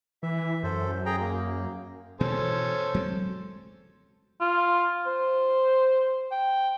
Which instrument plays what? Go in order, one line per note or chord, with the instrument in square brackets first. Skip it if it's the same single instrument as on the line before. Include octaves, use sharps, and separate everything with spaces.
[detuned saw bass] E3 [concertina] E5
[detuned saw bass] F#2 [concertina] A4 C5
[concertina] G#4 G5 A#5
A#3
[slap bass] B2 E3 B3 [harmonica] C#4 A4 C5
[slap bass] F#3 G#3 C4
[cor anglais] F4
C5
G5